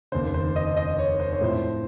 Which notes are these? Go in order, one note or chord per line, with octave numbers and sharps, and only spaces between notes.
F1 D#2 C#3 C5
C5
D#5
D#5
C#5
C5
C#5
A2 F3 C4 C5